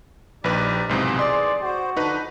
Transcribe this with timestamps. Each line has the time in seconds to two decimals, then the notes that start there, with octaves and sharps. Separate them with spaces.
0.44 A#1 D#4 G4 B4 D5
0.89 B1 G#2 C3 E3 G#4
1.19 D5 C6
1.62 F#4 C5
1.97 D3 F3 D4 D#4 B4